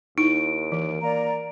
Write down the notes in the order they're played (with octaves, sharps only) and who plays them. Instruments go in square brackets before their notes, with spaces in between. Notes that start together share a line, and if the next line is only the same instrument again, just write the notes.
[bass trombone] D#2 [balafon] D#4 E4 [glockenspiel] D7
[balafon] E3
[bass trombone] A#3 [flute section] D5 A#5